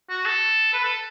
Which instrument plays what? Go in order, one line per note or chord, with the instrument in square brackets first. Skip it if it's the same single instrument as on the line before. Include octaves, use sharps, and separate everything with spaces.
[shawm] F#4
A4
B4
A4